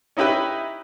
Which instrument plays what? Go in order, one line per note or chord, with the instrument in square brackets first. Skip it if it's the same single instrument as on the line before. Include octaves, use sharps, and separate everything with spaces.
[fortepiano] C#4 D#4 E4 G4 B4